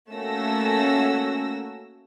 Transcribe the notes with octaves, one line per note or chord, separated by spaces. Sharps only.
A3 A#3 C#4 F#4 E6 A#6